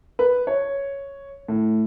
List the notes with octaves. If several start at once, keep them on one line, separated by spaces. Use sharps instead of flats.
B4
C#5
A2